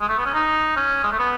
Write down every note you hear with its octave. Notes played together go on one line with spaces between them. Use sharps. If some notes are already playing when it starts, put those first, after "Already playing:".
G#3
A3
B3
C#4
D#4
C#4
G#3
A3
B3